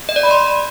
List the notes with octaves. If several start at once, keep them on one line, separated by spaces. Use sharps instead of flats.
D#5
D5
B5
C6